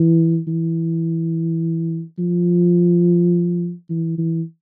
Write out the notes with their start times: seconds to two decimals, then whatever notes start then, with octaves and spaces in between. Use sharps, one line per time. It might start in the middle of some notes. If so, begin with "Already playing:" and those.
Already playing: E3
0.48 E3
2.19 F3
3.90 E3
4.18 E3